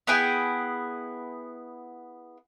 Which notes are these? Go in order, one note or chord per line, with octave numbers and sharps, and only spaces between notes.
B3 E4 G#4 G5